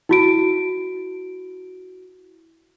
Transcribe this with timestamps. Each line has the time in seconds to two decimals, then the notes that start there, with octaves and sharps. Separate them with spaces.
0.09 E4 F#4 D7